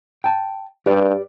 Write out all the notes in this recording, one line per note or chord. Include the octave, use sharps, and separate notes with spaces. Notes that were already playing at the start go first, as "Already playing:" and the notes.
G5 A5
G2 G4 B4 D5